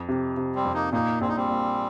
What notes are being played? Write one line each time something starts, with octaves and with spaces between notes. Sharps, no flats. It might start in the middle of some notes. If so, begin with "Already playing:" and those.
Already playing: F2
C3
C3
G3 C4
F2
A#3 D#4
A#2 A#3 D#4
A#1 C4
D#4
G3 C4
A#2